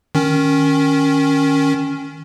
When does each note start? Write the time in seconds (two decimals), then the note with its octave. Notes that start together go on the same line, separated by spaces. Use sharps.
0.15 D#3 C#4